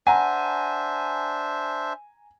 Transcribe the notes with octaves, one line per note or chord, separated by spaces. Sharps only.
D4 C5 E5 F#5 G#5 A#5